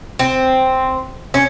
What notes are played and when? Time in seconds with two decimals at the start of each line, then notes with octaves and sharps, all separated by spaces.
0.19 C4
1.34 C#4